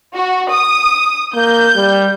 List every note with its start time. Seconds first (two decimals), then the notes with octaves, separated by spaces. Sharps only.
0.15 F#4
0.52 D#6
1.35 A#3 G6
1.76 G3